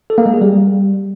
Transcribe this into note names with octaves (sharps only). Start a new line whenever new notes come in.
A4
A#3
G#3
G#4
G3